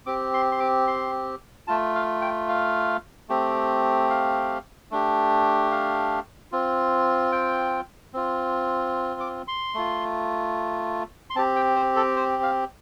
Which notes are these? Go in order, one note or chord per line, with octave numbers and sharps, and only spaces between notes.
C4 G4 D6
C6
C6
D6
C6
A3 F4 A5
F5
G5
F5
A3 C4 G4
F5
A3 D4 G4
F5
C4 F4
G5
C4 F4
D6
C6
A3 F4
C6
C4 G4 A5
G5
C5
A4
C5
F5